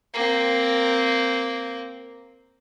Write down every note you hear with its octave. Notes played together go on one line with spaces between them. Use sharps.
A#3 C4